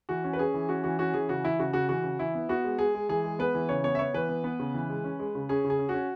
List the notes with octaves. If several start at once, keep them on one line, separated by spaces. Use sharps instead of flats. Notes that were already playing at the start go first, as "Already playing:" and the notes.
E3 F#4
C#4
B4
C#4 G#4
E3
C#4 F#4
E3 F#4
C#4 F#4
E3 G#4
C#3 F#4
E3 E4
C#3 F#4
C#3 F#4
E3 F#4
C#3
E3 E4
B3
B3 F#4
G#3
G#3 G#4
G#3
E3 G#4
G#3
B3 B4
E3
C#3 C#5
B3 C#5
E5
B3 C#5
E3 B4
B3
B3
C#3
E3
G#3
C#4
G#3
C#3
C#4 G#4
C#3
G#4
C#4
F#4
C#4